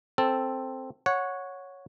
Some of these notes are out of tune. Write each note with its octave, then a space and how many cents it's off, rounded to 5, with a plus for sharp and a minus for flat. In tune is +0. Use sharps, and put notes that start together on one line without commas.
C4 +0 A4 +0
C#5 +0 F#5 -15